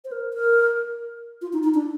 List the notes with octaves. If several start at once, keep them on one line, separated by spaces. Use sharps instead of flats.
C5
A#4
A#4
F4
D#4
D#4
D4